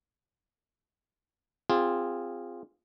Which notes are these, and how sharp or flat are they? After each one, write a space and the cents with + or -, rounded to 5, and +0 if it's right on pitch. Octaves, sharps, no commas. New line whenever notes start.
C4 +0 F4 +0 G#4 -20